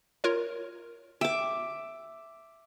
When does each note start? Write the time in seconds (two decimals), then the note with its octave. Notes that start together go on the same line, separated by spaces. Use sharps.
0.24 F4 A#4 C#5
1.21 E5 G5 D6